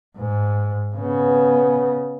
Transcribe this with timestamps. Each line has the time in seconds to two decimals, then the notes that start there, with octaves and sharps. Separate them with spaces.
0.17 G#2
0.96 C#3 B3